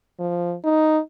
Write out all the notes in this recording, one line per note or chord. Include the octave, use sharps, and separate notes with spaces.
F3
D#4